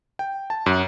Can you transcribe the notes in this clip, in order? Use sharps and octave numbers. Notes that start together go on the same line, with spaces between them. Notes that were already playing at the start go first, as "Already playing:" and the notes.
G5
A5
F#2